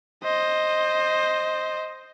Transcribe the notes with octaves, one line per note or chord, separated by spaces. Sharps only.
C5 D#5